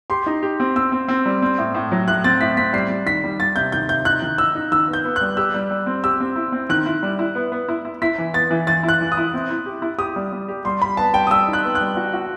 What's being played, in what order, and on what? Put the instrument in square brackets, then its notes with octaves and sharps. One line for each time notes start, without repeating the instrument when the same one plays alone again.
[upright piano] G4 [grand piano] C6
[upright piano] D#4
G4
C4
[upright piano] C4 [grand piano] E6
[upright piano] C4
C4
G3
C4
A2
A2
F#3
[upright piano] A2 [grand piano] F#6
[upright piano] C4 [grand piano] A6
[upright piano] A2 [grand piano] B6
[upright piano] C4 [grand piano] B6
[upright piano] G3 [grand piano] C7
[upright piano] G3
[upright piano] D#3 [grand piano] B6
[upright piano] G3
[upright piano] G3 [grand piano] A6
[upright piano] C3 [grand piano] G6
[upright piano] D#3 [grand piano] G6
[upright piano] C3 [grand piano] G6
[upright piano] D#4 [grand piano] F#6
[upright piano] D#3
[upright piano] D#4 [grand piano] E6
[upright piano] D#4
[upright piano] D#3 [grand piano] E6
[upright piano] B3
[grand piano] G6
[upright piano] B3
[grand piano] F#6
[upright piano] G3
[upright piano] G4 [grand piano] E6
[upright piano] G3
G3
C4
[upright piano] G4 [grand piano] E6
[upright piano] C4
E4
C4
[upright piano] D#3 [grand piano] F#6
[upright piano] E4
G3
E4
B3
B3
E4
E4
[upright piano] E4 [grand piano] B6
[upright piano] E3
[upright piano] B3 [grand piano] A6
[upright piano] E3
[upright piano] E3 [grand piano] A6
[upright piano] E4
[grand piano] F#6
[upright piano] E3
[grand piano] D#6
[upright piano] E4
C4
E4
G4
E4
[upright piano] G4 [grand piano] D#6
[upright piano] G3
G3
G4
[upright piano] G3 [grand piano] C6
[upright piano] G3 [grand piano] B5
[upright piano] B3 [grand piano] A5
[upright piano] G3 [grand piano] G5
[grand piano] D#6
[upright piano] G3 [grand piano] E6
[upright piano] D#4
[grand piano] F#6
[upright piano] B3
[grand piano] F#6
[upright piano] G3
F#4
F#4